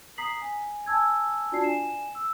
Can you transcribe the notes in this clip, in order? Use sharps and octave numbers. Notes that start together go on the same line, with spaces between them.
A#5 D#6 B6 C7 F#7
G#5
G#5 A5 E6 G#6
D4 F4 F#4 D5 A5 C7
G#5 E7
E6